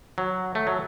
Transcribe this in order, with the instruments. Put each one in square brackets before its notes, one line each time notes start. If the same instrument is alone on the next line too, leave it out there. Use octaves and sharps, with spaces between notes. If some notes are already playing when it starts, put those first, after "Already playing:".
[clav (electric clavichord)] F#3
A3
F#3